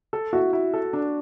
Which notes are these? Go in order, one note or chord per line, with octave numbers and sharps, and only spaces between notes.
A4
E4 F#4
E4
A4
D4